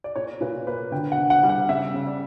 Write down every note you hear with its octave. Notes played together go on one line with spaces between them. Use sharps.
D5
A#2 C#5
A#2 B4
A#3 B4
D3 G5
F#5
D3
F#5
G3
F#5
C#3 E5
C#3
D5